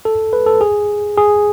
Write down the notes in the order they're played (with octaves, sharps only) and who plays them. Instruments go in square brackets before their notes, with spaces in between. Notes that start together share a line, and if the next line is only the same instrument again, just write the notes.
[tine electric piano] A4
B4
A4
G#4
G#4